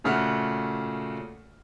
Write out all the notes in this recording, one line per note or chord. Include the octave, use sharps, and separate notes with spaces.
A#2 C#3 A3 F#4 F6